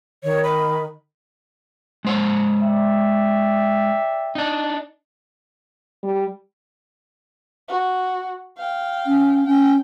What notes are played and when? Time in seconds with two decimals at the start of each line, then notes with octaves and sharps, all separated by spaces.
0.24 D#3 C#5
0.44 B5
2.05 G#3 C5 C#5
2.62 D5 E5 G5
4.35 D4 D#4
6.03 G3
7.68 F#4
8.57 F5 G5
9.06 C#4
9.47 C#4 G5